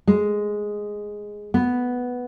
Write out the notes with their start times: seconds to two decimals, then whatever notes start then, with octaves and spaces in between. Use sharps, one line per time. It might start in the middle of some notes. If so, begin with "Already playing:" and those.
0.07 G#3
1.54 B3